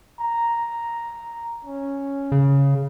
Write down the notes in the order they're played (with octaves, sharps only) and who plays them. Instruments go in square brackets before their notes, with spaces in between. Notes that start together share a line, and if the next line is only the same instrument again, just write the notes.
[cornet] A#5
C#4
[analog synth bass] C#3